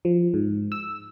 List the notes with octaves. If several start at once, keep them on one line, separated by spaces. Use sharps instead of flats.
F3
G#2
E6